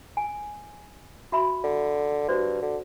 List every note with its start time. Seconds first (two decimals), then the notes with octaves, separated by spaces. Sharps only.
0.17 G#5
1.32 F#4 E5 B5
1.63 D3
2.29 G2 F#4 C5 D5
2.62 D3